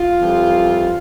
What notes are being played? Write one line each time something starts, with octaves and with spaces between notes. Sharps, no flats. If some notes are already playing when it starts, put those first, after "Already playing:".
Already playing: F4
F2 E3 G3